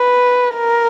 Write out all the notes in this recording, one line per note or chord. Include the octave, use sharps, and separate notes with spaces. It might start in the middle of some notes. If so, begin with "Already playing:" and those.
Already playing: B4
A#4